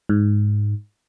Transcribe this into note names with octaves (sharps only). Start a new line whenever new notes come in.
G#2